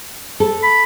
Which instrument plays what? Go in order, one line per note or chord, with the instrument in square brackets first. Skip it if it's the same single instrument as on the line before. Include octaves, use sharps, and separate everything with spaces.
[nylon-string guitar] A4
[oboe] B5